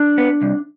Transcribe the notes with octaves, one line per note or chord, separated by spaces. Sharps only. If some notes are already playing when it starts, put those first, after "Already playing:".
Already playing: D4
B3
C2